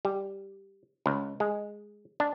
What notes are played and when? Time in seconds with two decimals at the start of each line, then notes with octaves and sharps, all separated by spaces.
0.05 G3
1.06 C#2
1.40 G#3
2.20 D4